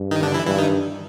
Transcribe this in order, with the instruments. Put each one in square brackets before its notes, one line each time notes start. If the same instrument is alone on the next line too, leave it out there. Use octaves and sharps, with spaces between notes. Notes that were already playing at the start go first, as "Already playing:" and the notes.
Already playing: [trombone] G2
[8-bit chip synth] D#3 D#4
D3 D4
E3 E4
[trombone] G2 [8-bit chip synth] E3 E4
[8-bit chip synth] D#3 D#4